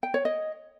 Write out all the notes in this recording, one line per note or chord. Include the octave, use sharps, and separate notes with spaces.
G5
C#5
D#5